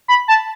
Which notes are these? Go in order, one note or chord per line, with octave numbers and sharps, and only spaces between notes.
B5
A5